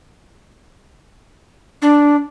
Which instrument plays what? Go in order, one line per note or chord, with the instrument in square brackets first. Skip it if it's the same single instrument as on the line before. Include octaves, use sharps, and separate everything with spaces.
[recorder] D4